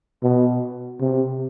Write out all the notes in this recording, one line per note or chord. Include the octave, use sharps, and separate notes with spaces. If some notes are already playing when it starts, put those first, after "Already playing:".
B2
C3